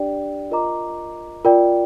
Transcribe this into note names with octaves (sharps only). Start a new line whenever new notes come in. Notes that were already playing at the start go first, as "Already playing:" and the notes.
Already playing: D4 G4 D5 G5
F4 A#4 D#5 A#5 D6
F4 A#4 D5 G5